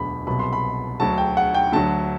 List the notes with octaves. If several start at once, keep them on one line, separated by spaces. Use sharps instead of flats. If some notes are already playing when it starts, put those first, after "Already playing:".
Already playing: E1 D2 D3 F#3 B5
C2 B2 F#3 B5
C6
B5
D2 D3 F#3 A5
G5
F#5
G5
D2 D3 F#3 A5